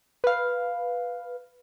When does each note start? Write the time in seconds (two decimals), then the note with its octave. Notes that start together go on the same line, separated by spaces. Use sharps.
0.24 B4 F5